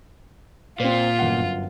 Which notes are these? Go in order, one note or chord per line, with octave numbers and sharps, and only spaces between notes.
A#2 C4 F4 C5
G1 F#2 F#5